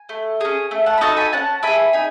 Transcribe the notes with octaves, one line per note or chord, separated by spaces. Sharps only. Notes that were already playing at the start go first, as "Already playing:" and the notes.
Already playing: G#5
A3
C#4 G#4
A3
F#5 A5
B5
D#4 F#4 A4 A5 C#6
G#5 B5
C#4 F#5 A5
E4 G#4 G#5 B5
D#4 G#5 B5